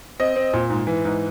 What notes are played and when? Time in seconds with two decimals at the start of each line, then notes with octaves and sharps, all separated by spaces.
0.20 C4 D#5
0.36 C4
0.53 A#2
0.70 G#2
0.87 E3
1.05 G#2